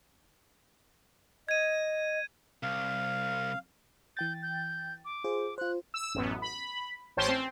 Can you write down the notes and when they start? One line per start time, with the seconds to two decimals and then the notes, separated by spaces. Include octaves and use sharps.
1.49 D#5 G#6 D#7
2.63 C2 F5
4.17 E3 G5 G6 A6
4.42 G6
5.05 D6
5.24 F4 G#4 C5
5.58 F4 C5 F#6
5.94 E6
6.15 A1 F#2 B3
6.42 B5
7.17 A1 C#4 C5 G5 A5 C6
7.28 C4